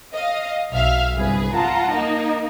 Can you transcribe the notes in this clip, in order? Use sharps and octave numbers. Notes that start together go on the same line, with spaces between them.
D#5 F5
B1 E5 F5 F6
G1 C2 G#4 B4
F4 F#5 A5 A#5
A#3 D#4